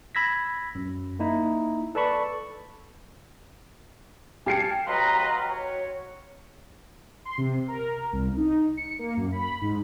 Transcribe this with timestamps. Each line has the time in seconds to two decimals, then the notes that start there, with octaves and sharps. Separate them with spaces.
0.15 B5 E6 G#6 A#6 B6
0.75 F#2
1.19 A#3 D#4 E4
1.95 A4 B4 D5 A5 B5 C#6
4.46 G4 F5 G#5 A5 C7 C#7
4.87 F#3 B4 D#5 F5 A#5 C6
5.49 F#4 C#5
7.25 C6
7.38 C3
7.68 A#4
8.13 C2
8.37 D#4
8.77 C#7
8.99 A#3
9.17 F#2
9.32 B5
9.61 G#2